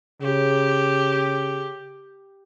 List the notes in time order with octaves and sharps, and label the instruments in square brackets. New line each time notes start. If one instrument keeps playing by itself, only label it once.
[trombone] C#3 [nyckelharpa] G4